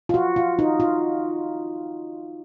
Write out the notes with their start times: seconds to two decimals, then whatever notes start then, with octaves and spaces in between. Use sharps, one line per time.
0.09 F4
0.14 F#4
0.36 F4
0.59 D#4
0.80 F4